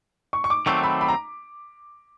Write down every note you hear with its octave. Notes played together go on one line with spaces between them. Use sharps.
C#6
C#6
D6
D#3 F#3 A3 C4 C#6
B5
B5
A#5